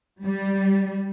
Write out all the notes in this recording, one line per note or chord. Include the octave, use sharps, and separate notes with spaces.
G3